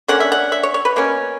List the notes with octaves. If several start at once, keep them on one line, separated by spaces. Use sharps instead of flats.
D3 A#3 C#4 F#5
E5
F#5
E5
C#5
C#5
B4
B2 A#3 C#4